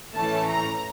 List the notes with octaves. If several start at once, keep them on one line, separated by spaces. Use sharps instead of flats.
A2 E3 A3 C#4 A5
A#5